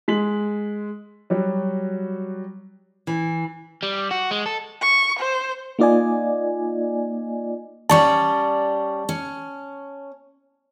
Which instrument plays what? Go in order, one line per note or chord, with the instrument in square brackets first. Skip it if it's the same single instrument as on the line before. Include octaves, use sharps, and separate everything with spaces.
[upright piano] G#3 B6 F#7
F#3 G3 F#4
[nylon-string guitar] E3
[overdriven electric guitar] G3
F#4
G#3
A4
[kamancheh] C#6
C5
[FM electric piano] A#3 D#4 F4 D5 D#5 G#5
[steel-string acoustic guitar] G3 C#4 D5 [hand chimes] A5 C#6
[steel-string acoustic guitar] C#4